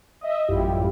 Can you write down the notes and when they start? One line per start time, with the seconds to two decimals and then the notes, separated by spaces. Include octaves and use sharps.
0.21 D#5 E5
0.48 A1 F#2 G3 E4 F4 G4